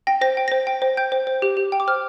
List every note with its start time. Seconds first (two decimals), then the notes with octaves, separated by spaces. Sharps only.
0.07 G5 A#6
0.21 C5 A#6
0.37 G5
0.48 C5 A#6
0.67 G5
0.82 C5
0.97 G5 G6
1.12 C5
1.27 C5
1.42 G4
1.57 G4
1.72 G5
1.80 D6
1.88 C5 F6